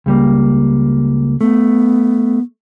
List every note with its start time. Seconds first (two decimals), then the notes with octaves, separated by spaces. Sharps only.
0.06 C#2 G3 A#3
1.41 A3 B3